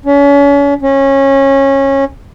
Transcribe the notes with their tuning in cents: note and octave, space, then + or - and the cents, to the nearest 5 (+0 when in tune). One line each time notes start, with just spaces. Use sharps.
C#4 +35
C#4 -20